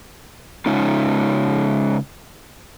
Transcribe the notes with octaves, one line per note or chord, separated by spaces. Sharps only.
C#3 G#3 C#4 D#4 F4